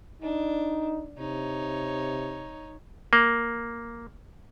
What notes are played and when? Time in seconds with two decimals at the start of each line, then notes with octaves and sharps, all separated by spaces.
0.22 D4 D#4
1.18 C3 D#4 C#5
3.13 A#3